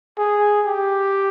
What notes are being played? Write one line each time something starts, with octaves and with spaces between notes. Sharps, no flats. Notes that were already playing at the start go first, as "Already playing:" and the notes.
G#4
G4